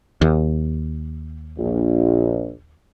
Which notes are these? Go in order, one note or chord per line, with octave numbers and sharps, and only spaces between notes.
D#2
A#1